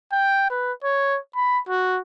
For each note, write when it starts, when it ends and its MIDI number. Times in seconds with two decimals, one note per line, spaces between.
0.12 0.50 79
0.50 0.72 71
0.83 1.18 73
1.36 1.59 83
1.69 2.00 66